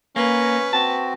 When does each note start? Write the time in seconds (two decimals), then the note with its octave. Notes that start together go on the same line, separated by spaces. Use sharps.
0.16 A#3 C#4 B4
0.73 C4 F#4 A5